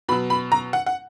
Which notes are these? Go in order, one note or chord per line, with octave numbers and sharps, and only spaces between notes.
B2 F#3 B5
B5
A#5
F#5
F#5